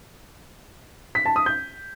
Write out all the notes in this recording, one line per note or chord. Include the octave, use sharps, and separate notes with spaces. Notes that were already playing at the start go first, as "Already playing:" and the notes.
B6
A5
D#6
G6